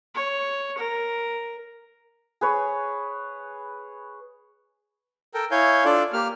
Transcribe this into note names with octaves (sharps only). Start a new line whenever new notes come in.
C#5
A#4
G#4 B4 C#5
A4 A#4 G5
E4 C#5 F5 G#5 G6
D4 F4 A4 D5
A#3 G4 F6